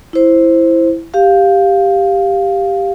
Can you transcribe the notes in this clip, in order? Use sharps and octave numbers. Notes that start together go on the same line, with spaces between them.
E4 C5
G4 F5